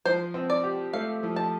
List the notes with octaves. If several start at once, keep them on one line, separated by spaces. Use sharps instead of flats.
F3 C5
C4
D5
G4
A3 F5
F3
A5